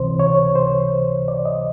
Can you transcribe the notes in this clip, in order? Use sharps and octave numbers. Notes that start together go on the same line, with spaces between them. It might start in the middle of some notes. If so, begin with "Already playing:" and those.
Already playing: C#2 C3 E3 C5
C#5
C5
D5
D#5